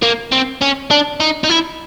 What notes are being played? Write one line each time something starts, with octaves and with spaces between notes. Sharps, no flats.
A#3
C4
C#4
D4
D#4
D#4
E4